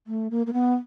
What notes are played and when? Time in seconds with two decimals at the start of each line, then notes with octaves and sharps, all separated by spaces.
0.07 A3
0.31 A#3
0.46 A#3
0.53 B3